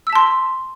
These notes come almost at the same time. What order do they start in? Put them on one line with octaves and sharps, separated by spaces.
E6 B6 A5 C6